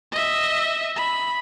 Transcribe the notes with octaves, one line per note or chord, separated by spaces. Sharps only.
D#5 E5
B5